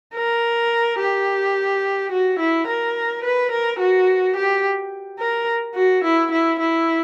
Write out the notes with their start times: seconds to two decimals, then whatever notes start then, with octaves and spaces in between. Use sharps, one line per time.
0.15 A#4
0.99 G4
2.11 F#4
2.39 E4
2.67 A#4
3.24 B4
3.51 A#4
3.80 F#4
4.36 G4
5.19 A#4
5.75 F#4
6.04 E4
6.31 E4
6.59 E4